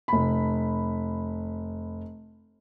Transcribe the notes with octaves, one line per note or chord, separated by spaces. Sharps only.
F1 B5